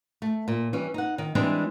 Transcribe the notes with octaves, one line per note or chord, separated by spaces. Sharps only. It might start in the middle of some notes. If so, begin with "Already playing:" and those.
A3
A#2
E3 G3 C#4
D#4 F#5
D#3
E3 G3 G#3 C4 D4 G#4